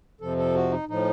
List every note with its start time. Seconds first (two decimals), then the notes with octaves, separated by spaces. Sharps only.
0.21 F2 C3 F3 A4
0.37 A4
0.54 F#4
0.71 D#4
0.88 A2 F3 D#4